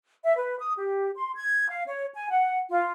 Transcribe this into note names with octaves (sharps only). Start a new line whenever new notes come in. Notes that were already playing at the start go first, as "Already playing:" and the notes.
E5
B4
D#6
G4
C6
G#6
F5
C#5
G#5
F#5
F4